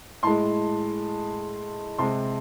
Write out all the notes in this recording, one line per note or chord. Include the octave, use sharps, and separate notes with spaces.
A2 G#3 A5 C6
C3 G#3 A5 C6